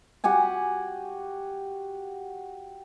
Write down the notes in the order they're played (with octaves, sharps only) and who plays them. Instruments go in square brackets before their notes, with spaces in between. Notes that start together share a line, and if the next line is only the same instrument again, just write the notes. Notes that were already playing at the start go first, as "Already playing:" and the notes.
[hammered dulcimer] F#4 G4 F#5 G#5